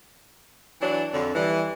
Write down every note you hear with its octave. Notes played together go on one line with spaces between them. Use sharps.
E3 F#3 D4
F2 D3 F#3 D4
E3 G3